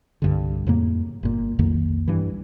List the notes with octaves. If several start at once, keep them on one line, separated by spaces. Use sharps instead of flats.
C2 G2 D3
F2 A2 C#3 A#3
G1 A#2
B1 F2 D#3 A#3
G2 E3